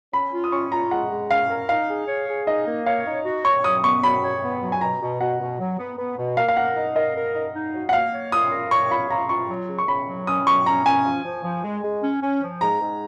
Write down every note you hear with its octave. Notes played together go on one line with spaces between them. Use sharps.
C#4 B5
F4
D#6
C#4 C#6
F4 A#5
G#3 F#5
G#3
C#4 F5
A#4
D#4 F5
G#4
C#5
G#4
D#4 D#5
A#3
C#5 F5
D#4
F#4
C#5 C#6
F#3 D#6
B3 C#6
F#3 B5
C#5
B3
F#3
G#5
B2 A#5
B2
B2 F#5
B2
F#3
B3
B3
B2
A#3 F5
F5
A#4 F#5
D#4
A#4 D#5
A#4
D#4
D#4
F#3
F#5
A#3 F5
C#5
F4 D#6
A#4
C#5 C#6
F4 B5
F4 A#5
F4 C#6
F#3
C#3
C#6
C#3 B5
F#3
C#4 D#6
F#3 C#6
C#4 A#5
C#4 G#5
F3
F3
F3
G#3
G#3
C#4
C#4
F3
G#2 A#5
G#2